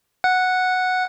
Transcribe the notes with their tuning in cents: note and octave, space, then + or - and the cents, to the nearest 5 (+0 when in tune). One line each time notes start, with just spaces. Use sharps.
F#5 -5